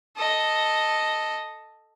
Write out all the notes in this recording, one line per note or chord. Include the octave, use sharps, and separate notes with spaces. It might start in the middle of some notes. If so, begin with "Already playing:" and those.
A4 D#5